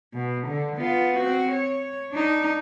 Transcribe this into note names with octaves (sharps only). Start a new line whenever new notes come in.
B2
D3
B3 F4
C4 F#4
C#5
D4 D#4